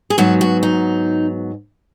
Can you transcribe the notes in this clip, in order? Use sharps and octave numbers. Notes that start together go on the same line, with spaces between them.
G#4
G#2 F#3 B3 F#4
F#4
D#4